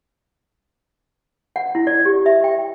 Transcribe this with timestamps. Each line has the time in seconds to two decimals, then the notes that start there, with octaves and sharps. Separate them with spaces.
1.56 F#5
1.75 E4
1.87 D5
2.05 G4
2.26 E5
2.44 G5